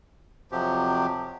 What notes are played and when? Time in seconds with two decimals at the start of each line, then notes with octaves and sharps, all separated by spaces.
0.52 F2 C3 F3 F#3 G4